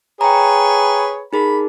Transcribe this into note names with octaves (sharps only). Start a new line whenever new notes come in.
G#4 B4 C#5 G5 A#5
D#4 G#4 A#4 B5